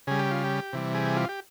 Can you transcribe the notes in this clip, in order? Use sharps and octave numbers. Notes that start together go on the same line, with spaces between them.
C#3 G3 G#4
G4
F4
G4
C3 E3 G3
G#4
F4
G4